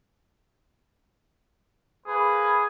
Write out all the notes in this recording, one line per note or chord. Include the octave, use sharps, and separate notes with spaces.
A#3 G#4 B4